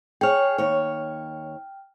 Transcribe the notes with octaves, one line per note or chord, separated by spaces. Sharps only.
G#4 C#5 G5 F6
D#2 C#5